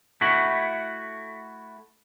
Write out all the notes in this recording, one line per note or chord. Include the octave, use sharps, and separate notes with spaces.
A3 E4 F#4